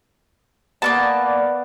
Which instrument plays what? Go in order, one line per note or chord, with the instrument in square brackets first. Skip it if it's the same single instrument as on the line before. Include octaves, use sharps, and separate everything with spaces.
[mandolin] A#3 C#4 A5 [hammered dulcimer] B3 [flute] D5